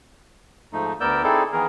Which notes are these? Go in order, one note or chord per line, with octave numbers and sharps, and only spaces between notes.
G#2 F3 A3 D#4
D2 B3 A#4 D5 E6 G6
C4 D#4 E4 G#4 A4 D5
D#3 E3 B3 G#4 A#4